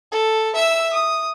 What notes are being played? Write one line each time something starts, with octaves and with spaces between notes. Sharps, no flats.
A4
E5 E6
D#6